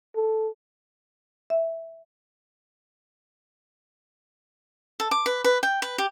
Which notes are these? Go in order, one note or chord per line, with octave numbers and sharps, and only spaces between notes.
A4
E5
A4
D6
B4
B4
G5
B4
G4